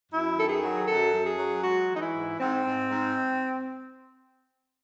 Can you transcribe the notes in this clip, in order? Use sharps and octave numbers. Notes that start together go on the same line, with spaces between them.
F#2 E4
D#3 A4
G#4
F#3
F#2 A4
F#2
G#4
F#3
G#3 F#4
E3
D#4
E4
G#2
G#2 C4
G#2
G#2